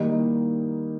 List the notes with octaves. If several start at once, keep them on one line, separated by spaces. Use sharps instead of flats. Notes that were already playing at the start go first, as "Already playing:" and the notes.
Already playing: D#3 G3 A#3 D#4